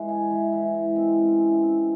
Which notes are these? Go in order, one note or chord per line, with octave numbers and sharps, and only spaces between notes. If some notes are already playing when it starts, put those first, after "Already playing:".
Already playing: E3 G#3
G#4
E3
E3
G#3
C4
C#4
E4
C4